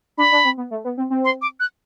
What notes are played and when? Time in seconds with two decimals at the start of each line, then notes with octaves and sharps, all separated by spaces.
0.17 D4 B5
0.32 D4
0.45 C4
0.57 B3
0.71 A3
0.85 B3
0.97 C4
1.10 C4
1.25 C6
1.42 D6
1.60 F#6